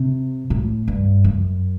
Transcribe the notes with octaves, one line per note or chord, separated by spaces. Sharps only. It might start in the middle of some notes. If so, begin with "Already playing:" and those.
Already playing: C3
A2
G2
F#2